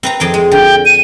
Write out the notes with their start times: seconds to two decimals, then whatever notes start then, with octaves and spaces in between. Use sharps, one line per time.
0.03 C4 B4 A#5
0.20 F2 G#4 G5
0.34 G#3
0.51 D3 G5
0.86 D#7